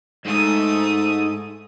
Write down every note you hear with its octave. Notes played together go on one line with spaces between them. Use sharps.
G#2 A3 D#6